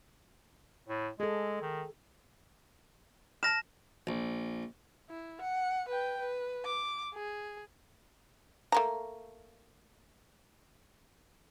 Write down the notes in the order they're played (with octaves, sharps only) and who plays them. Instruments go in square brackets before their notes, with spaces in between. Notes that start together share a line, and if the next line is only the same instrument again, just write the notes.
[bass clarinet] A2
[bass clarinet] G#3 [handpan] G#4 A4
[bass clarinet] D#3
[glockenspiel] A5 A#6 E7 [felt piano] F6
[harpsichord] A#1
[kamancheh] E4
F#5
B4 G5
B4
D6
G#4
[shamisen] A3 A#3 A#5